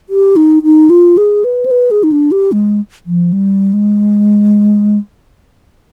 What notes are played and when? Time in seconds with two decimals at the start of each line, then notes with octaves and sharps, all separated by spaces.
0.09 G4
0.36 D#4
0.63 D#4
0.90 F4
1.17 G#4
1.44 B4
1.66 C5
1.71 B4
1.91 G#4
2.03 D#4
2.12 D4
2.32 G4
2.52 G#3
3.06 F3
3.33 G3
3.73 G#3